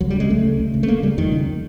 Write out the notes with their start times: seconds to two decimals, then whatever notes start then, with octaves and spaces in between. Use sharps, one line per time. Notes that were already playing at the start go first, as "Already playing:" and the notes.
0.01 C#2 F#3
0.10 G3
0.16 C#3 G#3
0.30 C#2 A3
0.45 C#3
0.59 C#2
0.74 C#3
0.83 A3
0.88 C#2 A#3
1.02 C#3 G3
1.18 F2 D#3
1.32 C#3